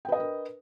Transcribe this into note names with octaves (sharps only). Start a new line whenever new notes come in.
D4 A#4 B4 D#5 G5